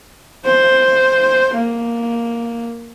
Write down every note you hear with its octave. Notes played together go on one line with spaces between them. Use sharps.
C5
A#3